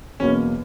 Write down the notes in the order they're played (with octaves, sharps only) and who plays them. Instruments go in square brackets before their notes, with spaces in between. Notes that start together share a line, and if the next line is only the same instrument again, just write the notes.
[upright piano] E2 B2 F#3 A#3 [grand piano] C#4